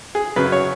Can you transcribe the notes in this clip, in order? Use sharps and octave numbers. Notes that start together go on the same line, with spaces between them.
G#4
F#2 C#3 F#3 B4
C#5